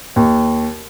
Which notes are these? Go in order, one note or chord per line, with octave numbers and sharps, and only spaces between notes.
D#2